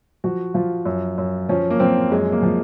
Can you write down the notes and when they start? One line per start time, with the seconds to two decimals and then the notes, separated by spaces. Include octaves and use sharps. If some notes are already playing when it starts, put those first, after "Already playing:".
0.24 F3 F#4
0.54 F3 F4
0.86 F#2
1.18 F#2
1.49 F3 C#4
1.70 A#3
1.80 F3 C4
2.11 F#2 G#3
2.32 A#3
2.43 F3